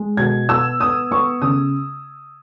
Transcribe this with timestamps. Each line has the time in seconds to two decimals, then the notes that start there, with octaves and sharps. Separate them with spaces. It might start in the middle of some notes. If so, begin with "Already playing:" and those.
Already playing: G#3
0.17 B2 G#6
0.48 B3 E6
0.80 B3 D#6
1.11 B3 C#6
1.42 C#3 D#6